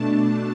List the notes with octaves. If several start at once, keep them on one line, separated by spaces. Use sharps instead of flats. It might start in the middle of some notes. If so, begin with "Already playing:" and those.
Already playing: B2 A3 D4 A5